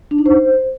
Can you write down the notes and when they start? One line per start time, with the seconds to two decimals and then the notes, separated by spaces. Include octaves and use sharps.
0.11 D4
0.18 D#4
0.26 C5